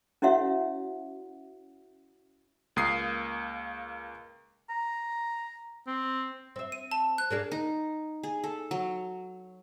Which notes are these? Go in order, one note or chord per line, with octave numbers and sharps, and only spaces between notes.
C#4 E4 F#4 C#5 E5 F#5
C#2 A#3 D#6 C7
A#5
C4
C4 E5
D#7
A5
F#6
A#3 D4 G#4
D#4
G#4
A4
F#3